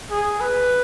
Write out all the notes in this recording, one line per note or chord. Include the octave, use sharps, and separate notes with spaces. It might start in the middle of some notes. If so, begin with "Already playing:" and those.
G#4
B4